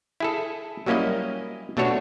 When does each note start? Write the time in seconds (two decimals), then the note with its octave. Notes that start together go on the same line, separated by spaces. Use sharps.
0.20 E4 G#4 A4
0.86 F#3 G3 A#3 C#4 E4 D#5
1.77 B2 A3 D4 F#4 C#5